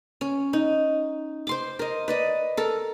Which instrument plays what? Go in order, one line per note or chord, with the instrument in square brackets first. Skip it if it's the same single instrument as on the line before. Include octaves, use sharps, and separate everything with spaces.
[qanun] C#4
D#4
C5 C6 D6
A#4 D#5
B4 D5 D#5
A4 A#4